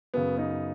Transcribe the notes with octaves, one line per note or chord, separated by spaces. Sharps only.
F#2 C#3 B3
B3 D#4